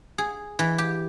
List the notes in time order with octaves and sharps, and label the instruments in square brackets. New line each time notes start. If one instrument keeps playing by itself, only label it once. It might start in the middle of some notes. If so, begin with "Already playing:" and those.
[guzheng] G#4
E3
G4